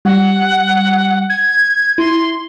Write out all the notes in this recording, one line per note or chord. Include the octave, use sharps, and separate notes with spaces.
G3 F#5
G#6
E4 C6